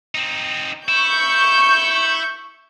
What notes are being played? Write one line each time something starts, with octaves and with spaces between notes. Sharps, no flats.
C4 D#4
E4 C#6 G6